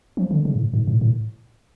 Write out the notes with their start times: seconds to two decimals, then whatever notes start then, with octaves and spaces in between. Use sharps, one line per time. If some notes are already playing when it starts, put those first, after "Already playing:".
0.17 F3
0.31 D3
0.45 C#3
0.55 G#2
0.59 A2
0.74 G#2
0.87 A2
1.01 A2